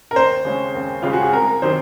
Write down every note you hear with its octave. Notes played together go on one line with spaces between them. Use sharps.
A#4
D#2 C5
C#3 G#3 C#4
D#2
C#3 G#3 C#4 F4
F#4
G#4
C2 A#4
C3 D#3 F#3 C5